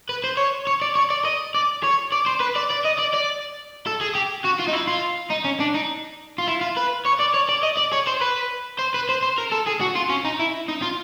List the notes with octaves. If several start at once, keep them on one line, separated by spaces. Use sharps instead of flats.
B4
C5
C#5
C#5
D5
C#5
D5
D#5
D5
C#5
D5
C5
B4
D5
D5
D#5
D5
D5
A4
G#4
G4
F#4
F4
D#4
E4
F4
D#4
C#4
D4
D#4
F4
E4
F4
B4
C#5
D5
C#5
D5
D#5
D5
C#5
C5
B4
C5
B4
C5
C5
A#4
A4
G#4
F#4
F4
C#4
D#4
E4
D#4
F4